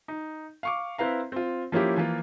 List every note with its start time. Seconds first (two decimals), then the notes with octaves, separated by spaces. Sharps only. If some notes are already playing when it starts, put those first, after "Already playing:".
0.08 D#4
0.63 F5 C#6 D6
0.98 C4 E4 B4 F5 A#5
1.32 C4 F4
1.72 F3 A#3 C#4 E4 G4
1.97 E3 F3 A#3 F4